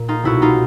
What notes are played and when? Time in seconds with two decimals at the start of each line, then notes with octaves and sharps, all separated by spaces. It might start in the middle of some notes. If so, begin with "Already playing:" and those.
Already playing: A#2
0.08 D#4 F4
0.23 C2 B2 E4 F#4
0.42 D#4 F4